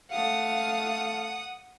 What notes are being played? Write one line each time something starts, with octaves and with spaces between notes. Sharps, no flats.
A3 F5 F#5 D#6